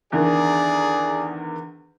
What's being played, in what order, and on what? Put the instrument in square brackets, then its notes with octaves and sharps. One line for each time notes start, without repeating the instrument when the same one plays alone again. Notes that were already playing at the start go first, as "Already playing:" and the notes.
[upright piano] E2 D3 D#3 [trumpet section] G#4 D5